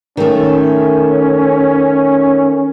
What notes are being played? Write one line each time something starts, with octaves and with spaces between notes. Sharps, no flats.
D#3 A3 C#4